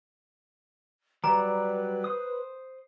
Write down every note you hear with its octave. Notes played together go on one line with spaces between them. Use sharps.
F#3 G3 B4 D5 A#5
C5 D#6